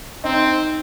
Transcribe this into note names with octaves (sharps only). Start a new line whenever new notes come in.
C4 D#4